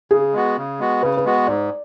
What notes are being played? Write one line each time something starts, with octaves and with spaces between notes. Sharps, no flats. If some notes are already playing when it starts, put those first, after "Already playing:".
C#3 G#4
G#3 B3 F#4
C#3
G#3 B3 F#4
C#3 B4
B4
G#3 B3 F#4
G#2 D5